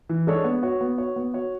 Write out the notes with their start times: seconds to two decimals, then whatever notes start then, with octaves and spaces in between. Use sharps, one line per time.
0.09 E3
0.27 G#3 D4 A4 C#5
0.44 B3
0.63 F#4 C#5
0.81 B3
0.98 F#4 C#5
1.16 B3
1.34 F#4 C#5